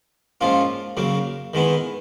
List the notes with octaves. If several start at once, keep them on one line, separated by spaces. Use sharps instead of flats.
G#2 F3 A#3 C#4 F4
C#3 F#3 A#3
D#3 G#3 B3 E4